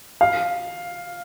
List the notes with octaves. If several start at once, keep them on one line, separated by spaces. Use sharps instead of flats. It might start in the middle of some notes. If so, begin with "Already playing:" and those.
F5